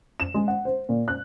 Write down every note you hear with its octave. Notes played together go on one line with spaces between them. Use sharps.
E7
G#3
F#5
C5
A#2
F#6